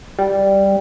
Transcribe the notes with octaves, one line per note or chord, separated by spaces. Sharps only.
G3